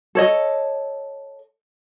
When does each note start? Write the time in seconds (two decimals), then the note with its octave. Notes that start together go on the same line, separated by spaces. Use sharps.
0.15 A4 C#5 D#5